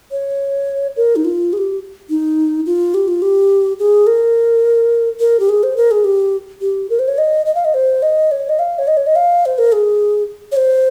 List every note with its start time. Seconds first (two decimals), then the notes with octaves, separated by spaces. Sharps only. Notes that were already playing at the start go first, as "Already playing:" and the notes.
0.11 C#5
0.97 A#4
1.16 D#4
1.25 F4
1.53 G#4
1.57 G4
2.10 D#4
2.66 F4
2.94 G4
3.08 F4
3.22 G4
3.79 G#4
4.07 A#4
5.20 A#4
5.40 G4
5.49 G#4
5.63 C5
5.77 A#4
5.91 G#4
6.04 G4
6.61 G4
6.90 A#4
6.99 C5
7.08 C#5
7.18 D#5
7.46 D#5
7.55 F5
7.65 D#5
7.74 C5
8.02 D#5
8.31 C#5
8.49 D#5
8.59 F5
8.79 C#5
8.87 D#5
8.97 C#5
9.07 D#5
9.16 F5
9.46 C5
9.58 A#4
9.72 G#4
10.52 C#5
10.57 C5